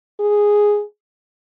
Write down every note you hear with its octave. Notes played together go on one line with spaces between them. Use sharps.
G#4